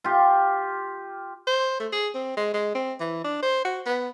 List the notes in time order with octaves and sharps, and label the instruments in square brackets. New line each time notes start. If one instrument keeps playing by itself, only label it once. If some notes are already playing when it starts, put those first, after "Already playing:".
[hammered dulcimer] F4 G4
[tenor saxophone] C5
A3
G#4
C4
G#3
G#3
C4
E3
D4
C5
F#4
B3